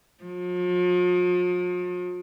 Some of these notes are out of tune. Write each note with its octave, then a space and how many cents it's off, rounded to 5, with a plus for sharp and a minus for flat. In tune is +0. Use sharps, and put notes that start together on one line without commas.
F3 +45